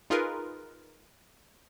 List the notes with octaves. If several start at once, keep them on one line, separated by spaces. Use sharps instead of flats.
D#4 F4 G#4 A#4 B4